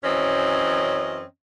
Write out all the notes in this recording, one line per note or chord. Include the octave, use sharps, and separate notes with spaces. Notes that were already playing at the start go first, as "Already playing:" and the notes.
F#2 E3 C4 C#4 C#5 D#5